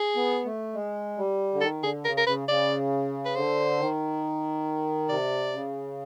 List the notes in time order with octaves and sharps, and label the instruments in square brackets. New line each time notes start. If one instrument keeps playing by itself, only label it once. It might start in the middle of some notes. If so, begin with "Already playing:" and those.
Already playing: [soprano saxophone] G#4
[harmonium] B3
A3
G#3
G3
D3
[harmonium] D#3 [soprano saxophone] A4
[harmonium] D3 [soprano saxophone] G#4
[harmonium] C#3 [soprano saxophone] A#4
[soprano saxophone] A#4
[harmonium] C#3 [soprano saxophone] B4
[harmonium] C#3 [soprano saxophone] D5
[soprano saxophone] B4
[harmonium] D3 [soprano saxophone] C5
[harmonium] D#3
[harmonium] C3 [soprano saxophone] D5
[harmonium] C#3